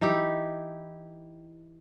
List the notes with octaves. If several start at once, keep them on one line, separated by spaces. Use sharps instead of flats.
E3 D#4 E4 G4